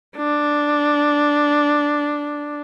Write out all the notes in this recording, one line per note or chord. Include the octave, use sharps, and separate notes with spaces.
D4